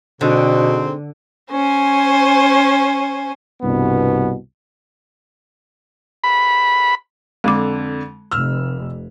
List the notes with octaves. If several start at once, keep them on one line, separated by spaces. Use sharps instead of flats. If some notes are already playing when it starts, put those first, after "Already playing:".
G#2 B2 D3 C4
C#4 C5 G#5
C2 G2 B2 B3
B5
F2 D3 G#3 D6
F1 E6 F6